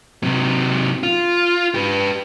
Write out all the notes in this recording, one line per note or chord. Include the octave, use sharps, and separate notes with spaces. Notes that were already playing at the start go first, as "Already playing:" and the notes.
C3 F#3
F4
G4 B4